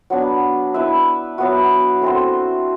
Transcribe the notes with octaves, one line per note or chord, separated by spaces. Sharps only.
F#3 B3 D4
E4 B4 E5
F#3 B3 F#4
A3 C4 F#4 C5